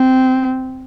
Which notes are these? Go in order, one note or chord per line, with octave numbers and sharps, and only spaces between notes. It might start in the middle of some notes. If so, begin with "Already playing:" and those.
Already playing: C4